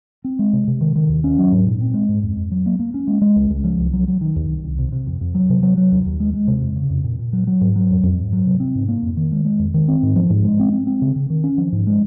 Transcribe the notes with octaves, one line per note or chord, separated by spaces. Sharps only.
C4
G#3
C3
C3
D#3
D#3
D#2
C#4
F#3
G#2
A#2
C4
G#3
G#2
F2
F2
F#3
A#3
A#3
C#4
G#3
G#3
C#2
C#2
F3
C2
F#3
F#3
D#3
D#2
C2
C2
C3
C3
F2
F2
F#3
C3
F#3
F#3
D#2
D#2
G#3
G#3
C3
F2
C#3
F2
A#2
A#2
F#3
F#3
G#2
F#3
F2
F2
G#2
F#3
C3
C4
G#2
A#3
F2
D#3
G#3
G#3
F2
D#3
C4
G#2
F3
G#2
G#3
C4
C4
C4
C#3
C#3
D#3
C#4
F3
G#2
G#3